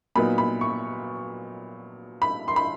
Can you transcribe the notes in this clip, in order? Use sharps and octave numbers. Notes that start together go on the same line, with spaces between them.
A#2 F#3 B3 D#4 B5
B5
C#6
B5
C6
B5